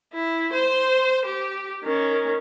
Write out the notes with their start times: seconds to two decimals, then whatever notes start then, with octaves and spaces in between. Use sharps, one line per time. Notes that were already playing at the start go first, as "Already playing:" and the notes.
0.13 E4
0.53 C5
1.26 G4
1.84 D#3 C#4